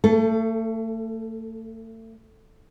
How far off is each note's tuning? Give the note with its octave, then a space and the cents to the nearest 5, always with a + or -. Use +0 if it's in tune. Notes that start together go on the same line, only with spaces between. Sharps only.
A3 +35 A4 +0